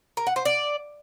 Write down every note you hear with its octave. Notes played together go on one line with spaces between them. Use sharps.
A#4
F#5
C5
D5